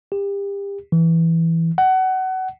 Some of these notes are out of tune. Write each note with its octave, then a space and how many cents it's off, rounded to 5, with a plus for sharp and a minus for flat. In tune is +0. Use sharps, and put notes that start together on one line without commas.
G4 +30
E3 +0
F#5 +25